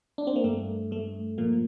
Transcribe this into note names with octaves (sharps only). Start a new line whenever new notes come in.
D4
C4
A#3
G2 A3
G2 A3
A#2 F3 A#3